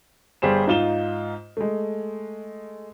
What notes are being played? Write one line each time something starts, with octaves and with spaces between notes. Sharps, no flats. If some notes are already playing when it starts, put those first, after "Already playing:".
G1 G3 G4 G#4 C5 E7
G#2 D#4 F4 E7 G7
G#3 A3